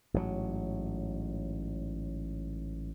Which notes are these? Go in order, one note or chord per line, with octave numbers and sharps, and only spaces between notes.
A1 G#2 C3 F#3